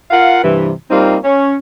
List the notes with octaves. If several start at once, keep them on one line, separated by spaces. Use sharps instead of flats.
F4 A#4 F5 F#5
G2 C3 E3
G3 A#3 C4 D#4 F4
C#4